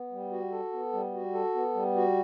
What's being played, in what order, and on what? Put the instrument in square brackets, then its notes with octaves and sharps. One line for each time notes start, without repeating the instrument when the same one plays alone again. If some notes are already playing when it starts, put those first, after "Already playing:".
Already playing: [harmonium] B3
G3
F#4
A4
B3
G3
F#4
A4
B3
G3
F#4